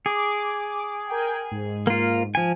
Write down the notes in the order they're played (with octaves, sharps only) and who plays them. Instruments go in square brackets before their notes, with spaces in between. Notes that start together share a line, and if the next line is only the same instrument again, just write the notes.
[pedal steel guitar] G#4 [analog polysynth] D6
[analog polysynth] A#4 G5 G#5
G#2
[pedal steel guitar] A#3 F4
F3 G#5